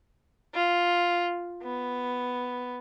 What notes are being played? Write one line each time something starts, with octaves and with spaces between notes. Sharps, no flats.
F4
B3